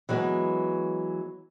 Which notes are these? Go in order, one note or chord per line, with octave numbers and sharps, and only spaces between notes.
E3 F#3 G#3 B3